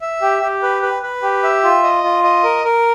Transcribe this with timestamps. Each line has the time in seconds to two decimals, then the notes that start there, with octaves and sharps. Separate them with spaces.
0.01 E5
0.21 G4
0.43 G4
0.63 B4
0.82 B4
1.02 B4
1.22 G4
1.43 E5
1.64 F4
1.83 D#5
2.04 F4
2.24 D#5
2.43 A#4
2.65 A#4